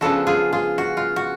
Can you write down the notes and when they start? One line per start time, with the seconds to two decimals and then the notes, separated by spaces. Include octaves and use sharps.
0.01 C#3 F3 B3 D4 F#4 A4
0.27 F4 G#4
0.53 F4 G#4
0.78 F#4
0.97 F4
1.16 F#4